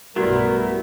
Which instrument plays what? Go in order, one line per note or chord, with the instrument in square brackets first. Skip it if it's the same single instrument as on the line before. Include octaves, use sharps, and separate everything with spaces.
[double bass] B1 G2 [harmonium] G3 A#4 [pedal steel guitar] A3 B3 E4 [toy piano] F#4